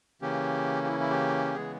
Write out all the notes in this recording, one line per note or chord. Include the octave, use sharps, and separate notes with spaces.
C#3 E3 A#3 C#4 G4
G4
E4
E4
G4
C#3 E3 G#3 B3 G#4